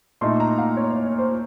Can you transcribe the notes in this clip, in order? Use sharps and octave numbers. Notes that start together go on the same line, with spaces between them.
A#2 A3 D#4 C6
A#5
F5
C#5
C#5
C#5
C5